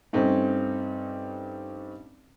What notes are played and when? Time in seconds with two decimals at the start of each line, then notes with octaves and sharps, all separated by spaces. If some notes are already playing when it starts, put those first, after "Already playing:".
0.13 G2 A3 C4 C#4 D#4